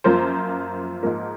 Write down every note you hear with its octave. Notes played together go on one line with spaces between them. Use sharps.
F#2 F3 A#3 F4 C5
G#2 F3 A#3